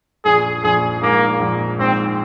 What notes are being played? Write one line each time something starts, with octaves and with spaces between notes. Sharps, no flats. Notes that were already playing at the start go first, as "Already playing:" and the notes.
A#1 G#4
A#1 G#4
G#2 A#3
A#1
G#2 C4